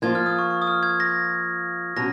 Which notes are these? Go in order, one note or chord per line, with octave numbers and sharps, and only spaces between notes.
F3 A#3 F4 G#6
F6
D#6
C#6
C#6
D#6
F6
G#6
A#6
B2 F#3 C#4 A#6